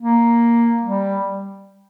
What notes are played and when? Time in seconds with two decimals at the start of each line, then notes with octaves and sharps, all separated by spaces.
0.01 A#3
0.82 G3